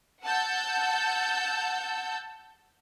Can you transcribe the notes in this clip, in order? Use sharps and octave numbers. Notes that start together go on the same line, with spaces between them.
F#5 A5 E6 G6